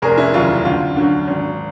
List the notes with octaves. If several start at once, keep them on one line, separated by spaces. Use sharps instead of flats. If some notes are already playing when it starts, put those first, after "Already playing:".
F1 G#4 A#4
E4
D#2 C#3 F#3 F4
D2 F4
D3 F#3
G#1